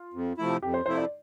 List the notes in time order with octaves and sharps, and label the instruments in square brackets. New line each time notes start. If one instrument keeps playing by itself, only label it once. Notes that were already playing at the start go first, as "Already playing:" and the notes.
Already playing: [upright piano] F4
[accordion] F2
C3 F3 A3 E4
[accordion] F2 [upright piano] G4
[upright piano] C5
[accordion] C3 F3 A3 E4 [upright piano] C5
[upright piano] D5